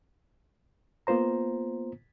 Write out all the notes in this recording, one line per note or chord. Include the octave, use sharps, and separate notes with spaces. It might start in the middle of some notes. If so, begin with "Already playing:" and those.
A#3 B3 F4 C5 A#5